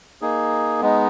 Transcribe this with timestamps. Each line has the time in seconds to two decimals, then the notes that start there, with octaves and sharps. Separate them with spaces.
0.22 A#3 D#4 G#4
0.81 G#3 B3 D#4